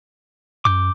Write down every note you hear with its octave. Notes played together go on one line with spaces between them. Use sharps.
F#2 D6 G6